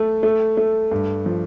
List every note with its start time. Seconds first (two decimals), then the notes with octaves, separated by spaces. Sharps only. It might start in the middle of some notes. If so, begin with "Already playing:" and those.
Already playing: A3
0.23 A3
0.57 A3
0.92 G2
1.26 F3